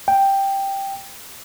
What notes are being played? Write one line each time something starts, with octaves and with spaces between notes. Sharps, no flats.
G5